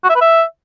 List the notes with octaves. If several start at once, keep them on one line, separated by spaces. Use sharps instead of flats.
F#4
E5
B4
E5